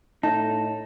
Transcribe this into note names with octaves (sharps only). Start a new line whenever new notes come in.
A2 D#4 A5